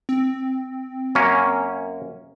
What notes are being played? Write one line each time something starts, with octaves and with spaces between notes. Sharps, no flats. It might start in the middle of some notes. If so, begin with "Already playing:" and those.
C4
F#2 A#3 C#4